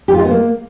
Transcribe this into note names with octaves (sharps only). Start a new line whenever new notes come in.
G4
F4
D#4
B3
A#3